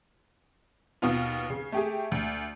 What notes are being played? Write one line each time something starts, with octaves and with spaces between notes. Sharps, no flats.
D#2 B2 B3 F4
C#3
A3 G4 G#4
D2